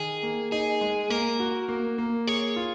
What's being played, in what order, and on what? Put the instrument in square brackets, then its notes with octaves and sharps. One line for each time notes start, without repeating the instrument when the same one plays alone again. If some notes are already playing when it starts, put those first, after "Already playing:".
Already playing: [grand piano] D#3 [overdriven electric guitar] G#4
[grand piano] A#3
[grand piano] D#4 [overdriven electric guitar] G#4
[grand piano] G#3
[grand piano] A#3 [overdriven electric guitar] A#4
[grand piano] F#4
A#3
A#3
[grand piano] G#4 [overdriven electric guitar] C#5
[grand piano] F4